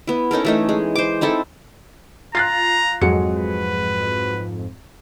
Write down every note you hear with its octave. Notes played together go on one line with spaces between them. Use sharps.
B3 E4
C#4 D#4 A4 A#4
E3 A3 D#4
G#3
C5 D6
C4 D#4 E4 A4
F4 A#5 F#6 A6 C7
F2 G#2 F#3 G#3 C#7
B4